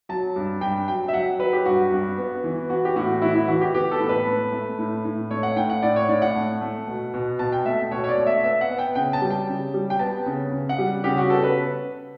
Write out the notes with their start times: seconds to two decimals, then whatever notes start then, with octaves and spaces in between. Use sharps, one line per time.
0.09 F#3 A5
0.36 G2
0.61 G2 G5
0.88 F#3 G5
1.08 E5
1.13 F#3 F#5
1.39 F#3 B4
1.53 G4
1.66 G2 F#4
1.92 G2
2.17 B3
2.44 E3
2.70 B3 F#4
2.85 G4
2.96 A2 F#4
3.22 E3 E4
3.35 E4
3.48 E3 F#4
3.61 G4
3.74 B3 G4
3.91 A4
4.00 A2
4.09 B4
4.26 A3
4.52 A3
4.79 A2
5.05 A2
5.31 A3 C#5
5.43 F#5
5.56 A2 G5
5.70 F#5
5.83 A2 D5
5.96 C#5
6.09 A2 D5
6.22 F#5
6.36 A3
6.61 A3
6.87 B2
7.14 B2
7.39 B2 A5
7.52 G5
7.65 A3 E5
7.91 B2 C#5
8.04 C#5
8.09 D5
8.17 A3
8.27 E5
8.43 B3 E5
8.61 F#5
8.69 B3
8.79 G5
8.95 C#3 G5
9.13 A5
9.21 G3
9.30 G5
9.48 C#3
9.74 G3
9.90 G5
9.99 B3 A5
10.26 C#3
10.52 C#3
10.69 F#5
10.78 G3
11.04 C#3 G4
11.17 F#4
11.30 B3 A4
11.43 B4